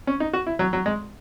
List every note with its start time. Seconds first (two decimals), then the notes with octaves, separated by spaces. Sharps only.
0.07 C#4
0.20 D#4
0.33 F#4
0.47 E4
0.59 F#3
0.73 F#3
0.86 G#3